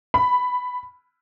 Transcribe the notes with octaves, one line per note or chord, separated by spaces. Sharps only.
B5